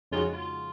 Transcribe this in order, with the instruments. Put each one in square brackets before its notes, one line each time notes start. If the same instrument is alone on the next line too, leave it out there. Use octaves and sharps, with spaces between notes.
[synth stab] F2 C#3 G#3 D#4 F#4 [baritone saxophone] F4
[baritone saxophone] F4